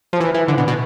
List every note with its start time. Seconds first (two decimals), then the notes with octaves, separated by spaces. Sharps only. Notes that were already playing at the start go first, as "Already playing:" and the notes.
0.13 F3
0.21 E3
0.34 E3
0.48 D3
0.58 B2
0.68 B2